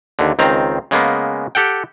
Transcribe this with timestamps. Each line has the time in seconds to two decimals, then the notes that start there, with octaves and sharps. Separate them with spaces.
0.19 D#2 D3
0.39 C#2 D#3 C4 A#5
0.91 C#3 G#3 A#3 B3
1.55 G4 A4 F#5 G5